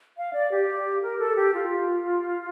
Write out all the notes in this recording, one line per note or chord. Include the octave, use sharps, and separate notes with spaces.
F5
D5
G4
A#4
A4
G4
F4